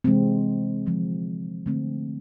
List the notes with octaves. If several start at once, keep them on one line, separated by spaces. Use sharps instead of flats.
C3 E3 G#3 C4
D3 F3 G#3
D3 A3 C4